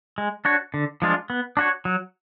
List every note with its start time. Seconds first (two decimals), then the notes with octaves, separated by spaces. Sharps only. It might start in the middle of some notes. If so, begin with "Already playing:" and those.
0.18 G#3
0.45 D4 F#4 C#5
0.74 D3
1.02 F3 G#3 D4 F4
1.30 B3
1.57 D4 F#4 C#5
1.85 F#3